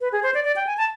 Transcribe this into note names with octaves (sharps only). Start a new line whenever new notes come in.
B4
G#4
C5
D5
D5
G5
G#5
A5